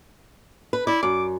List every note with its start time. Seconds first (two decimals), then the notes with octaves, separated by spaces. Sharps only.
0.73 B4
0.87 E4 D5
1.03 F#2 D6